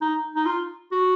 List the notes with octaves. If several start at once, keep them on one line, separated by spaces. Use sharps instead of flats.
D#4
D#4
F4
F#4